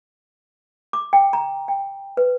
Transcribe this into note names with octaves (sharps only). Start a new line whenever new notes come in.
D6
G5
A#5
G5
B4